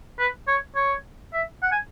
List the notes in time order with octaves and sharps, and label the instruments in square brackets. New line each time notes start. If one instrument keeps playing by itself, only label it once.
[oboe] B4
C#5
C#5
E5
F#5
G#5